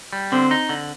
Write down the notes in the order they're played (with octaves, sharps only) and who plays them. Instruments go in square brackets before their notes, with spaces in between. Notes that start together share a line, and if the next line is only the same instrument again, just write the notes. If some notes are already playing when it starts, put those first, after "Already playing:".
[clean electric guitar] G3
[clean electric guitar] D3 [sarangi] C4
[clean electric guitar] D#4
D3